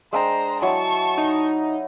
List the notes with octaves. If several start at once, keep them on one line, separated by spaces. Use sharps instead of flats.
G#3 D4 C5 G5 A#5
F#3 E4 D#5 A5 C#6
D#4